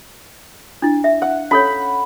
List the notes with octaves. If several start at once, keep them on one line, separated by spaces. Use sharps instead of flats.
D4 E4
E5
F#5
C#4 A4 C#5 B5